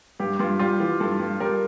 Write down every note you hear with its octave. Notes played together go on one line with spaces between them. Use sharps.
G2 G4
G2 F4
G3 F4
E3 G4
G2 A4
G2
G3 A#4